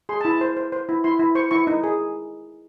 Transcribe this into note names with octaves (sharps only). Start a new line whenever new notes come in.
G#4 C6
A5
E4
A5
C5
C5
C5
E4
E4 C6
E4
C5 C#6
E4 C#6
D#4
G#4